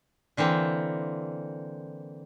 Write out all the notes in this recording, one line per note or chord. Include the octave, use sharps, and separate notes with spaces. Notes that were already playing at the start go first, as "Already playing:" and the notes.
D3 E3 A#3 C4